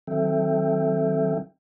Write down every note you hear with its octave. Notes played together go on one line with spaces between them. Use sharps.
D#3 F#3 C4 A4 E5 G5